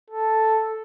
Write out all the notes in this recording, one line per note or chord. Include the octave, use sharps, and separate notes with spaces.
A4